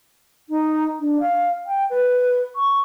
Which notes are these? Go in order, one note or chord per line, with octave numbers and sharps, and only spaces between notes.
D#4
D4
F5
G5
B4
C#6